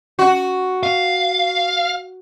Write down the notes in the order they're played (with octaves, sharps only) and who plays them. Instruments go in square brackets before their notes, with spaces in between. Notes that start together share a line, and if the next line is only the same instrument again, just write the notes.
[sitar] F#4
[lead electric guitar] F5